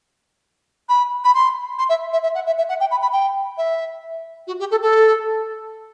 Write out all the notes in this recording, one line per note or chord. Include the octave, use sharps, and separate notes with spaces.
B5
B5
C6
C6
E5
E5
E5
F#5
E5
E5
F#5
G5
B5
B5
G5
E5
F#4
G4
A4
A4